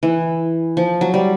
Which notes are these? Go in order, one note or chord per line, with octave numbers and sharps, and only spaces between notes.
E3
F3
F#3
G3